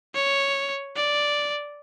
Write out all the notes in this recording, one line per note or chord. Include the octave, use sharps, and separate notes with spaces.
C#5
D5